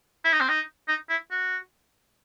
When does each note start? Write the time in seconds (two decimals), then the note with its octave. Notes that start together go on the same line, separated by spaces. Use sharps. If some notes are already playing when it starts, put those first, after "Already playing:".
0.25 E4
0.33 D#4
0.40 C4
0.48 D#4
0.88 D#4
1.10 E4
1.31 F#4